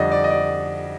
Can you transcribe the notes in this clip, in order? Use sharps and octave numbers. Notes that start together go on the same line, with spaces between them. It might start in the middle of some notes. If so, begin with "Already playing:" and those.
Already playing: F2 D3 G3 D5 D#5
D5
D#5
D5